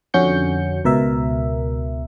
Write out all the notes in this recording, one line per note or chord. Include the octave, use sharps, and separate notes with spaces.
F2 D3 C#4 F#4 G6 C#7
C#2 B2 A#4 E5